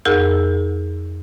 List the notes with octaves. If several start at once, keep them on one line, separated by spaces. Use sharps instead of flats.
F2 G#4 A#4 E6